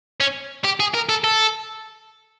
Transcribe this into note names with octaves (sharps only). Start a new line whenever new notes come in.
C#4
G4
G#4
A#4
A4
A4